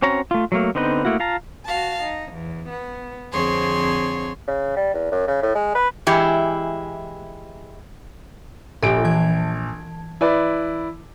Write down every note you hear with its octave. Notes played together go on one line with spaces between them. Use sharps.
C4 C#4 F#4 C#5 A#5
A3 F4
F#3 A3 A#3
D3 B3 C4 D#4 B4
A3 A#3 E4 F#4
F4 F5 A5 A#5
F#4 F5 A5
D#4
E2
B3
F2 D3 C4 G#4 C#5 C6
C#3
G3
E2
F#2
C#3
A2
G#3
B4
E3 G#3 E4 G4
A#1 F4 G4 A4 D7
E3 A5 G#6
E4 B4 D5